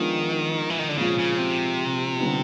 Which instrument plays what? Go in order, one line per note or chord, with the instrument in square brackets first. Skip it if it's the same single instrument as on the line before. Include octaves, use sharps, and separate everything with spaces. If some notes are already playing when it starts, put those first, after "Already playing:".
Already playing: [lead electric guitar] D#3 [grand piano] F3 G#3 B3 D4 F4
[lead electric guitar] E3
D#3
D3
[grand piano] A#2 F3 G#3 C4 F4 [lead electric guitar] C#3
[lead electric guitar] C#3
C3
[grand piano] D3 G3 B3 D#4